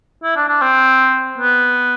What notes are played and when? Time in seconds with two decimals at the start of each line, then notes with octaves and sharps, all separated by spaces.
0.24 E4
0.36 D4
0.49 D4
0.62 C4
1.38 B3